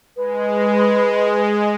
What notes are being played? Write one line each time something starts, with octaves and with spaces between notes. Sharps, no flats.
G#3 B4